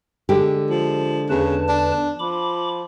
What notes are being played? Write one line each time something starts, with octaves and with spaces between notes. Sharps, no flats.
D3 G#3 G4
F3
E2 C#3 B4 A5
D4
F3 B5 D6